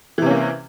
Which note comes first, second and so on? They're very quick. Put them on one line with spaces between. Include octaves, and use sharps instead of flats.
E3 C3 C#4 A#3